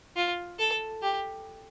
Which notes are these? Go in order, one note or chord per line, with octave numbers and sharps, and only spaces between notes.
F4
A4
G4